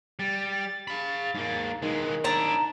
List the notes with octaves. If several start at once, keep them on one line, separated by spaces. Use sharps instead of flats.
G3 A6
F5 B5
G#2 A#3
D#3 E3 G#3
D4 E4 A5 A#5